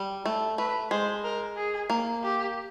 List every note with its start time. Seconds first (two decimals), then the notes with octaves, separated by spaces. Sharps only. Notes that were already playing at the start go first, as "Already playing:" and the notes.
Already playing: G3
0.25 A3
0.58 A3 B4
0.91 G#3 C5
1.24 A#4
1.57 G#4
1.90 A#3
2.24 G4